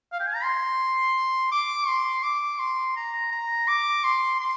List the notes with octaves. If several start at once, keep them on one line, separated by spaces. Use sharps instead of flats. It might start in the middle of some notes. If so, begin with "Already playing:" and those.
F5
G5
G#5
A#5
C6
D6
C6
D6
C6
A#5
A#5
D6
C6
C6